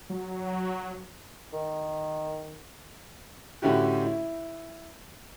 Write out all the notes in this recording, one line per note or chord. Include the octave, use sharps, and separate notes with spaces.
F#3
D#3
A2 D3 C#4 E4 F#4 G4
E4